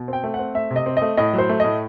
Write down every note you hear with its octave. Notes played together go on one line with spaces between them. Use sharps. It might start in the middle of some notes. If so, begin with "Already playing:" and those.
Already playing: B2
C4 G5
A3
F#5
C4
A3 E5
C3
D#5
C4
A3 D#5
A2 D#5
F#3
C5
A3
A2 D#5